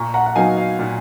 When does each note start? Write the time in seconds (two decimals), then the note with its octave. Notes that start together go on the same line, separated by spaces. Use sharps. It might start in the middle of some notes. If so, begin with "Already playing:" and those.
Already playing: A#2 A#5 C#6
0.14 F#5 A#5
0.26 F#5
0.35 F#3 B3 D#4 F5 G#5
0.57 F5
0.79 A#2